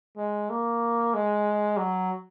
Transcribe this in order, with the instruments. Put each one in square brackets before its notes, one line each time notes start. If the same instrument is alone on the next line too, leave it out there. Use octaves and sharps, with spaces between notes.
[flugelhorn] G#3
A#3
G#3
F#3